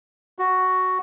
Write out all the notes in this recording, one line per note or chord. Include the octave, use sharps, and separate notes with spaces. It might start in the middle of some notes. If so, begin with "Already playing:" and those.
F#4